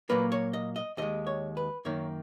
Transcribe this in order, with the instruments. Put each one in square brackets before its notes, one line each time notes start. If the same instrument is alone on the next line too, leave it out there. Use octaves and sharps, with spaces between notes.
[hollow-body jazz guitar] A#2 F#3 A#3 B4
C#5
D#5
D#5
D#2 D#3 G#3 D#5
C#5
B4
F#2 D#3 A#3 C#5